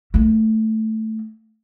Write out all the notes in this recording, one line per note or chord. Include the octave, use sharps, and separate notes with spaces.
A3 A#3